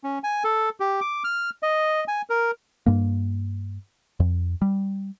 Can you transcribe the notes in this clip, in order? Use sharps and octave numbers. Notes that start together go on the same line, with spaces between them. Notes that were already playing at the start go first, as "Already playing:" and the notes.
C#4
G#5
A4
G4
D6
F6
D#5
G#5
A#4
G2 A#3
F2
G3